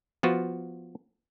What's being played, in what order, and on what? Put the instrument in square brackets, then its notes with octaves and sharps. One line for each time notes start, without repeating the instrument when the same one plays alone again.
[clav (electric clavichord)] F3 B3 F4 F#4